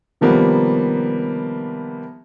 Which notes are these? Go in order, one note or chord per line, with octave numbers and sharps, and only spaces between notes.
C3 D#3 F3 G3 A#3 B3